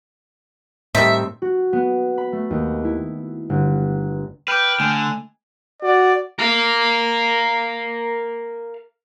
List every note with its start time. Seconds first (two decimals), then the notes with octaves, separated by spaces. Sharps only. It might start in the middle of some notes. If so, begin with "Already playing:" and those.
0.95 A2 D#3 G3 C4 A4 E5
1.42 F#4
1.73 B3
2.18 B5
2.32 A3
2.50 D#2
2.85 E4
3.50 G1
4.48 B4 G5 D6 F6 G6
4.80 D3 A3 G#5
5.82 F#4 D5
6.39 A#4 F5